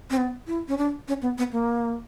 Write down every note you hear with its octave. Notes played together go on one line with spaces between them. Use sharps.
C4
B3
E4
C#4
D4
C#4
B3
B3
A#3